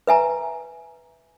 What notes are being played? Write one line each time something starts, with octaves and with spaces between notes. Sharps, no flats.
B4 E5 G#5 A#5